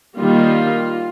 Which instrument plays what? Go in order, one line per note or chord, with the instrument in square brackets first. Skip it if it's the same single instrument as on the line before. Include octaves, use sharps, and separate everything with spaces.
[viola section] D#3 G3 A#3 F4